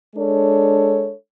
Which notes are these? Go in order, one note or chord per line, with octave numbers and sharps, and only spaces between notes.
G#3 D4 A4 C#5